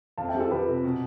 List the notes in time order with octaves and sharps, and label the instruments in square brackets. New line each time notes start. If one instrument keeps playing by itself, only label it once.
[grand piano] F2 [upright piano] F5 A5
[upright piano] E5 G5
[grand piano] F3 [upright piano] G4
[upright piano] F4 A4
[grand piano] F2 [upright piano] G4 B4
[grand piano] C3
B2